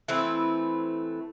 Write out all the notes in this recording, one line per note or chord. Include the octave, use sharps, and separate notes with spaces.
E3 A3 C4 E4